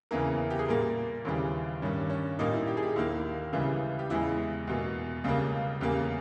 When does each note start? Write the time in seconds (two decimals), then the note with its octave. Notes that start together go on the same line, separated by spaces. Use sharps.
0.11 E2 C#3 E3 A#3 A#4
0.50 G4
0.59 G#4
0.68 A#2 G3 A#3 A#4
1.25 D#2 C#3 E3 G3
1.82 G2 D#3 G3 C#4
2.10 C#4
2.39 A#2 G3 A#3 D#4
2.54 E4
2.67 G4
2.77 G#4
2.83 G4
2.96 D#2 D#3 A#3 E4
3.53 C#2 C#3 E3 G3
3.99 G4
4.10 E2 C#3 G#3 E4
4.67 E2 B2 A#3
5.24 C#2 C#3 G3 A#3
5.81 E2 C#3 G3 A#3 G4